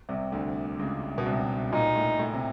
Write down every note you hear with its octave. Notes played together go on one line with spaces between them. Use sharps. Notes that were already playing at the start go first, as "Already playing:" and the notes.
C2 C3
D2 D3
C#2 C#3
B2
C2 C3
A#2 D#4
A2
A2
C3